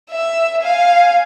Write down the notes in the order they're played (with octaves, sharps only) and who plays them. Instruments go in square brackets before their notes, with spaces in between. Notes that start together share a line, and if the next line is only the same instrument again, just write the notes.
[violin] E5
F5 G#5